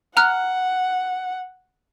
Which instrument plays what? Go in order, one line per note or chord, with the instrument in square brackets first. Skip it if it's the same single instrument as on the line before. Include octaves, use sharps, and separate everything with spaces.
[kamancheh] F#5 [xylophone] A#5 F6 F#6